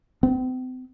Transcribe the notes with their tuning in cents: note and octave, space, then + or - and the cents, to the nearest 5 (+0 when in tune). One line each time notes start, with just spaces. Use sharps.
C4 -40